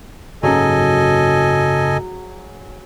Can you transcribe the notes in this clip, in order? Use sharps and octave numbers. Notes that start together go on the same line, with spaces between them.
F#1 G#2 F#3 C#4 G#4 A4 D#5 G#5